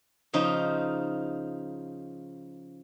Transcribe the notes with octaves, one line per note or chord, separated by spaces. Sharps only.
C#3 F3 D#4 F4